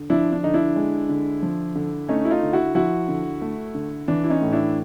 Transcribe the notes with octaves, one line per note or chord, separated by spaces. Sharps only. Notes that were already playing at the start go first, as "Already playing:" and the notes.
Already playing: D3
F3 D4 E4
D4
D3 D#4
D4 E4
G#3
D3
F3
D3
A3 C#4 D#4
E4
D#4 F4
D3
E4 F#4
F3 E4 F#4
D3
A3
D3
E3 D4
E4
C#4 D#4
A2
D4 E4